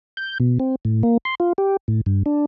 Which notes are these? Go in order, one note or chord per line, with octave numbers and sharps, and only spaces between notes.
G6
B2
C4
A2
A#3
C6
F4
G4
A2
G2
D4